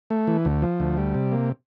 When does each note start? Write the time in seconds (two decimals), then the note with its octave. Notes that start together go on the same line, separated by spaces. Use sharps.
0.10 A3
0.27 E3
0.45 D2
0.62 F3
0.80 D2
0.97 G3
1.14 C3
1.32 A#3